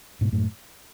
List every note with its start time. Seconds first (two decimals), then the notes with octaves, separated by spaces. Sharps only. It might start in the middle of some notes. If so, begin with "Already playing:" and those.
0.21 G#2 B2
0.32 F#2 A2